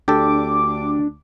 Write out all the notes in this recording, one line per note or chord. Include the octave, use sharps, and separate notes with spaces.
D2 D4 G4 A4 D6